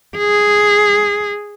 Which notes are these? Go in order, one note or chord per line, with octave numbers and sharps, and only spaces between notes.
G#4